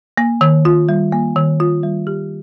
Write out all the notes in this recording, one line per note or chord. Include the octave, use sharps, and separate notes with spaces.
A#3
D#3
F4
G3
A#3
D#3
F4
G3
G4